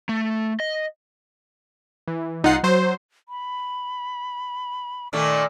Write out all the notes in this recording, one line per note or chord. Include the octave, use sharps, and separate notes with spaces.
A3
D#5
E3
C2 D#4 F4 F#5 C7
F#3 C5
B5
A#2 D#3 A3 D6